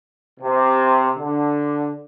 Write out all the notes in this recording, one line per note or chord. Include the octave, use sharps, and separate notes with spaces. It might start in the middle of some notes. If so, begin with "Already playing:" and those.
C3
D3